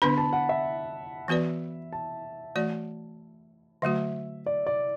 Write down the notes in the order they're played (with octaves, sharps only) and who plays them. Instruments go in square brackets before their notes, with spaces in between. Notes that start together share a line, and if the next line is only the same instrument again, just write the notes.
[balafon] D3 B3 D4 B4 [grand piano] B5
[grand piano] A5
F#5
E5
[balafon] E3 B3 F#4 B4 D5
[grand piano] A5
[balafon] E3 A3 F#4 D5
[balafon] D3 F#3 A3 F#4 [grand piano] E5
[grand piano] D5
D5